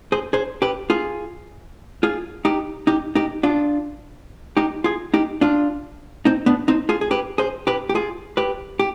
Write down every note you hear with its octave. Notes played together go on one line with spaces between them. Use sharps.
G#4 C5
G#4 C5
G4 B4
F4 G#4
F4 G#4
D#4 G4
D#4 G4
D#4 G4
D4 F4
D#4 G4
F4 G#4
D#4 G4
D4 F4
C4 D#4
B3 D4
C4 D#4
F4 G#4
G#4
G4 B4
G#4 C5
G4 B4
G4
F4 G#4
G4 B4
G4